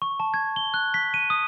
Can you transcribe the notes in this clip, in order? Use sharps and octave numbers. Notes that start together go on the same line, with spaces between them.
C#6
A5
G#6
G7
F#6
B6
D#7
D#6